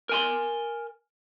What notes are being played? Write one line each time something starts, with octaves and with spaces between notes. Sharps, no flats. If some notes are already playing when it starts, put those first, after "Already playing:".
A#4 G#5 C6